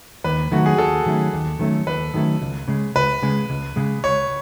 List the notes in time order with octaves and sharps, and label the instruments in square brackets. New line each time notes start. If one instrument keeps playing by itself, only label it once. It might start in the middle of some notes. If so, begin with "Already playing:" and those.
[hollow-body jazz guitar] D#2 [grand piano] B4
[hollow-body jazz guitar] D#3 F#3 A3 C#4 [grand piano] F#4
[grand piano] G#4
[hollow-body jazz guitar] D#2 [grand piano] A4
[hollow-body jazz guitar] D#3 F#3 A3 C#4
D#2
D#3 F#3 A3 C#4
[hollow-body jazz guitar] D#2 [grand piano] B4
[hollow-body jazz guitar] D#3 F#3 A3 C#4
C#2
C#3 G#3
[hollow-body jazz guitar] C#2 [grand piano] B4
[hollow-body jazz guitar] C#3 G#3
C#2
C#3 G#3
[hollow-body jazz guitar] C#2 [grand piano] C#5